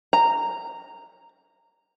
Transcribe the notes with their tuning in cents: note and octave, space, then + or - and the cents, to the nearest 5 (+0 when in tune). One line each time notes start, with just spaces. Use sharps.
A#5 -10